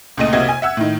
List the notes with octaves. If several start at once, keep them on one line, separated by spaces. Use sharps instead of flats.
C#2 A#2 A3 D#5 D#7
F1 C2 A#3 F#4 D#5 G#6
G#5
E5 F#5 E6 G#6
A2 D#3